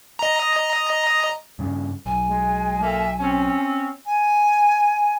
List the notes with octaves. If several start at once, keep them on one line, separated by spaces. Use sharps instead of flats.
D#5 A#5
G2 C#3
B1 G#5
G#3
A#3 F4 A4 E5
C4 C#4
G#5